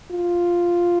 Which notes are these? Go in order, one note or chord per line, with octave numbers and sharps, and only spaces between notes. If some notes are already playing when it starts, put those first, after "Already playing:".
F4